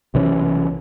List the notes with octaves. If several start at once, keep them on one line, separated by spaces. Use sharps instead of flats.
B1 C3 E3 C#4